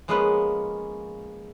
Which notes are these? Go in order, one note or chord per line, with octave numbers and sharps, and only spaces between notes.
F3 G#3 A#3 B3 C#4 B4